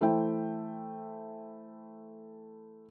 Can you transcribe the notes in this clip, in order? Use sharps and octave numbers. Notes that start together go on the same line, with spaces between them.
E3 A3 E4 C5 E5 G5